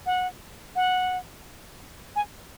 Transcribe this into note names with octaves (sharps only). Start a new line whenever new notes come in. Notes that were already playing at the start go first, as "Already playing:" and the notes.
F#5
F#5
G#5